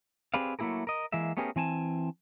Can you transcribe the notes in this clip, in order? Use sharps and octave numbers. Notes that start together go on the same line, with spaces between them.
C4 G4 G#4 B4 D5 F5
F#3 A3 A#3 E4 G#4 A#4
A#4 D#5
E3 G#3 A#3 E5
A3 B3 C#4 G4 G#4 A#4
E3 C4 G#5 A5